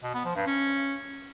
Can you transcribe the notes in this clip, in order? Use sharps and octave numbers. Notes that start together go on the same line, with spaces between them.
B2
B3
F3
G2
C#4